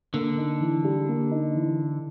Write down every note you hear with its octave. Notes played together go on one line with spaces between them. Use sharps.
D3 A#3
D#4
E3
G3
A#3
D#4
E3